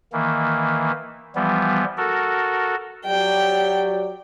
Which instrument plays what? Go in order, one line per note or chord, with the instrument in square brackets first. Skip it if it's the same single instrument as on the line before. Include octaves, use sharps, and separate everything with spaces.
[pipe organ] D#3 E3 A#3
E3 F3 G3 B3
F#4 A4 A#4
[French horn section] F#3 G4 D5 [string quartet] G5